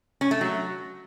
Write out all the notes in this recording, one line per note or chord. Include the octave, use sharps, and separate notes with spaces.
C#4
A3
F#3